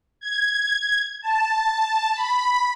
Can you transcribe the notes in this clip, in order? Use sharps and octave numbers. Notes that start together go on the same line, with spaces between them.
G#6
A5
B5